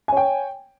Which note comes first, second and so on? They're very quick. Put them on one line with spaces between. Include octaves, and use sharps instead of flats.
G#5 C#5 G5